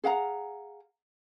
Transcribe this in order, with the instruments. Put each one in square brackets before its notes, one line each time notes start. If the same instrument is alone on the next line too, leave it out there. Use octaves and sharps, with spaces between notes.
[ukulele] G#4 F5 F#5 A#5